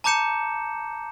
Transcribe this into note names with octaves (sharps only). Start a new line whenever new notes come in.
A5 A#5 D6 G6 C#7 E7